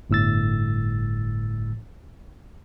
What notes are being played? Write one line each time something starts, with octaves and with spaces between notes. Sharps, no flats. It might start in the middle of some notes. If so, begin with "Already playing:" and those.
G1 A2 E6 A6